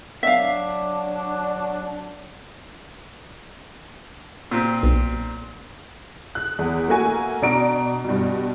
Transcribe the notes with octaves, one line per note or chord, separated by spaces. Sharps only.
F#3 D4 E5 F5
A#2 C4
B1
F#6
E2
A3 A#3 F#4 G#5
B2 D4 D5 A#5 D7
G2 B2